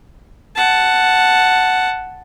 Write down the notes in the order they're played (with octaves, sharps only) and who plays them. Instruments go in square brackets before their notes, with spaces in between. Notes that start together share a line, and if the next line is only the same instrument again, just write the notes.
[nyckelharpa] F#5 A5